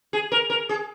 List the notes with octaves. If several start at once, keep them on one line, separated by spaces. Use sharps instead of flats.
G#4
A#4
A#4
G#4